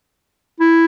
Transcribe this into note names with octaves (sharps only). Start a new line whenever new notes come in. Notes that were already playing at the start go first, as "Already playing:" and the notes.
E4